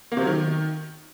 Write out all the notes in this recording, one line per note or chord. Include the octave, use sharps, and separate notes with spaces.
A#3
C3
F#3
D#3